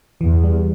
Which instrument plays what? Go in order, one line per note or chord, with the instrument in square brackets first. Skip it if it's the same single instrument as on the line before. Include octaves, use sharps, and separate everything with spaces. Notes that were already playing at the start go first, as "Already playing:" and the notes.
[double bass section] E2 [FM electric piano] E3
[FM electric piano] G3